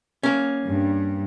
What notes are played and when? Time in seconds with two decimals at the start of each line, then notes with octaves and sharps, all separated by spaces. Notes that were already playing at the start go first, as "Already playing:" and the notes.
0.23 A#3 C#4
0.65 G2